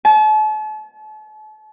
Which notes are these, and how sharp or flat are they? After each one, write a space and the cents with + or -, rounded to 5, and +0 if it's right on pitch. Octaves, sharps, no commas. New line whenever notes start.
A5 -40